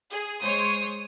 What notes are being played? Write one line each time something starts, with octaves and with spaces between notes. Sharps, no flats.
G#4
G#3 C5 C#5 D#6